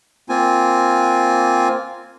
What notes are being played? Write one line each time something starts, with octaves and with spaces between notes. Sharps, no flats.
A#3 C4 F4 G#5